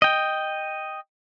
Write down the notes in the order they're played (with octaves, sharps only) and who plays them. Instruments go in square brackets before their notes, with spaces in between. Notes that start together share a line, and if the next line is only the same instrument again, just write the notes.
[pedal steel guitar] D#5 G5